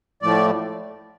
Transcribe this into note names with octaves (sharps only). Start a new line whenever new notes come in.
A2 F3 A3 D5